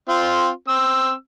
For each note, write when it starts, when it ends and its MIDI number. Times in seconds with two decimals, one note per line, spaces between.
0.09 0.49 60
0.09 0.49 65
0.68 1.13 60
0.68 1.13 88